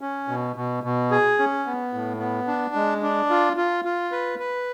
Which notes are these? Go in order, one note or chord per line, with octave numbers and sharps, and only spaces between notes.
C#4
B2
B2
B2
G#4
C#4
B3
A2
B3
D4
G#3
D4
F4
F4
F4
B4
B4